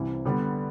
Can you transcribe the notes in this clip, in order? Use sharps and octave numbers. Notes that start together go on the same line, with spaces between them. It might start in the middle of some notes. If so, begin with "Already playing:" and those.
Already playing: C2 C3 E3
D3 G3 B3